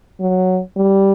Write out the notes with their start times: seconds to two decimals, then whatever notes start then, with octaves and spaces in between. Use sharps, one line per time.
0.20 F#3
0.76 G3